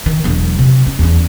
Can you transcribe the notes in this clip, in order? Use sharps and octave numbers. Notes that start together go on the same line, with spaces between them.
D#3
E1 F#3
C3
C#4
E2 C#4